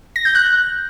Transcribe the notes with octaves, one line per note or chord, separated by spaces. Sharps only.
A#6
G6
F#6